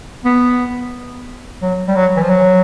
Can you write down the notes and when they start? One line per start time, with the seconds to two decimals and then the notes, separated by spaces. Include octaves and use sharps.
0.25 B3
1.62 F#3
1.88 G3
1.96 F#3
2.16 E3
2.23 F3
2.30 F#3